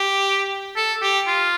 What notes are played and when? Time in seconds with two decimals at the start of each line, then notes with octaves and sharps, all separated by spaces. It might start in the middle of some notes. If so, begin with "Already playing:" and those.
Already playing: G4
0.76 A4
1.02 G4
1.27 F4